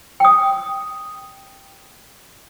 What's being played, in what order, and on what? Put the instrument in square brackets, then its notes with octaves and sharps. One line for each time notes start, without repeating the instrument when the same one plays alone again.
[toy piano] G5 D#6